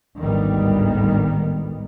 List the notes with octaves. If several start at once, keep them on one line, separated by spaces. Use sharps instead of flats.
G#1 D2 A2 D#3 G3 B3